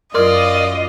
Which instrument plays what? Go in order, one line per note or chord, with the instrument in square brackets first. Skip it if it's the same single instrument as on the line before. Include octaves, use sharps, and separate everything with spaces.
[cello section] F#2 F4 [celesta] A#4 C6 F6 [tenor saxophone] D5 [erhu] D#5